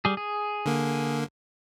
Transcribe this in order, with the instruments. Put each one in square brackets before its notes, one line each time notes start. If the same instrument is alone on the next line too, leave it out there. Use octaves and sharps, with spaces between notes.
[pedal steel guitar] G3 G#4
G#4
[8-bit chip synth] D3 A#3